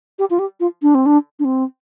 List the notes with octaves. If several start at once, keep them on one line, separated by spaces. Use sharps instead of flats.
G4
F4
G4
F4
D4
C4
D4
D4
C4